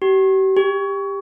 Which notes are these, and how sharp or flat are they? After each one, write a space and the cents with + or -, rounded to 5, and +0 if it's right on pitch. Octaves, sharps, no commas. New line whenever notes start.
G4 -40
G4 +15